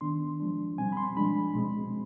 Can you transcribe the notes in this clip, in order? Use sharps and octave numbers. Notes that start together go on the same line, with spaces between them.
D#3 B3 D4 C6
F3 G#3 D4
B2 G3 C4 G#5
B5
C6
F3 G#3 D4 B5
B2 G#3 C4